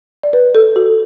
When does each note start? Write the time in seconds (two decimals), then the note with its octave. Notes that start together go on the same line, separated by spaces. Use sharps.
0.23 D5
0.33 B4
0.55 A4
0.76 F#4